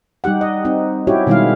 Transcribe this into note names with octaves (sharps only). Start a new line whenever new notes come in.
G3 D#4 G4 F#5
D#5
C4 D#4
C#4 E4 F#4 G4 C#5
B2 D#3 G3 G#3 E4 F5